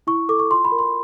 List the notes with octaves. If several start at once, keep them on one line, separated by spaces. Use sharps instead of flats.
E4 C#6
A4 D6
C#6
F4 C6
B5
A#4
C6